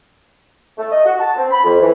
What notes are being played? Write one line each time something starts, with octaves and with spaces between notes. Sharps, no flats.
A3
D#5
F#4
A5
C4
B5
F2
E3